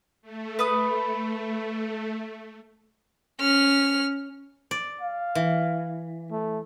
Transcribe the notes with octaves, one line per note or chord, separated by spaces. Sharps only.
A3
B4 D#6
C#4 F6
D5
F5
E3
A3